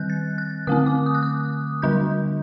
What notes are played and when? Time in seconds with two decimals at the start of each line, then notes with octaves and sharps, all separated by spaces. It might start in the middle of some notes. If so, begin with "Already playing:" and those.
Already playing: D#3 G3 C4 F#6 G6
0.10 A6
0.38 F#6
0.67 D3 A3 C4 D#6
0.86 D6
1.06 D#6
1.15 F#6
1.23 D#6
1.82 D3 G3 D4 G6